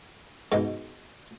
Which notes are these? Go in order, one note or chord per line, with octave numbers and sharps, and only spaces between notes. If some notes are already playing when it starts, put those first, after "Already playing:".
G#2 B2